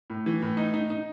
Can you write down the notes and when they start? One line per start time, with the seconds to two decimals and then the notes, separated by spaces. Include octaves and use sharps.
0.10 A2
0.26 E3
0.42 A2
0.57 D#4
0.74 D#4
0.90 D#4